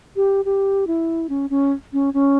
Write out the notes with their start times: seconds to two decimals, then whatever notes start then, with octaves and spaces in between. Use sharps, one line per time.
0.16 G4
0.45 G4
0.87 E4
1.29 C#4
1.50 C#4
1.93 C#4
2.14 C#4